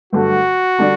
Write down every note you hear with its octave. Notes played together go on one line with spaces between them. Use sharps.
G2 D3 F#3 A3 F#4
D3 G3 D4